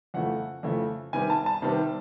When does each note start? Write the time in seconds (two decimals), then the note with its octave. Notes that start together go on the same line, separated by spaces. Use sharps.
0.14 F2 C#3 E3 A3 F#5
0.63 F2 C#3 E3 A3
1.13 C3 D#3 G3 B3 G#5
1.30 A5
1.46 A5
1.62 C3 D#3 G3 B3